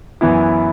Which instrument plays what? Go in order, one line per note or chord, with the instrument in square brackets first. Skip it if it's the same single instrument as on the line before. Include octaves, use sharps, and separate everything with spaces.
[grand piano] F#2 E3 B3 E4